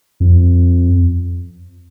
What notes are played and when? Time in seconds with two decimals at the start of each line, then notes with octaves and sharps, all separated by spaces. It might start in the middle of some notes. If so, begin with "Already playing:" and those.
0.20 F2